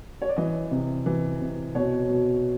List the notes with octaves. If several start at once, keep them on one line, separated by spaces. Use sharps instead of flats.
C#5
D5
E3 D#5
C3
E3
C3
B2 C#5
B2